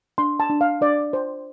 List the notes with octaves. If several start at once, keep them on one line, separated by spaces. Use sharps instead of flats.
D4 C6
A5
D4
F5
D4 D5
C5